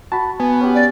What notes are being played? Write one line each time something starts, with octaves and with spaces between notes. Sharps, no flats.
F#4 A5 B5
B3 G#5
C#4 G4
D5